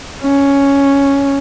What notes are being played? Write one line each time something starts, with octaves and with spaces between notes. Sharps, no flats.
C#4